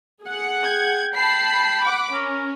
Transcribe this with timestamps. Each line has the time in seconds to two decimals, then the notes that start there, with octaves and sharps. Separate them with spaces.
0.23 G#4 F#5
0.63 G5 G#6
1.16 G5 A5 B5 C7
1.84 F#5 D6
2.14 C#4 A#4